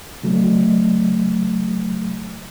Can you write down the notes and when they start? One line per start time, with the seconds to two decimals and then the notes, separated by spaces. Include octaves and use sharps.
0.23 C#3 F#3 A3